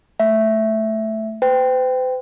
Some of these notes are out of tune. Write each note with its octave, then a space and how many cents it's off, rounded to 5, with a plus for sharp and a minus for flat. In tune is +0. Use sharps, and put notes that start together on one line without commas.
A3 +0 E5 +0
C5 -45 G5 +0